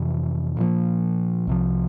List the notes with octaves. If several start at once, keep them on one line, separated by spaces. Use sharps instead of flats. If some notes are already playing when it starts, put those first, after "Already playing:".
Already playing: F2 C3 E3
A#2 F3 A#3
C2 C3 F3